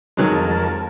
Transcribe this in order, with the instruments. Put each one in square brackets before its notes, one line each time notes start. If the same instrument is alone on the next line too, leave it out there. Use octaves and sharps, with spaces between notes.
[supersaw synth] F2 A#4 A5 [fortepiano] D#3 F#3 G#3